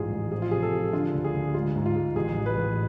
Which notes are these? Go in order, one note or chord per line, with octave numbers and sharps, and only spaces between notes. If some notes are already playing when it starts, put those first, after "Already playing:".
Already playing: A1 G#2 F4 G#4
A1
F3 G#4
F4
C3 G#4
A4
F3
D3 F4
D2
G#4
D2
G#3 F4
G#2
F4
G#3
A1 G#4
A1
B4
A1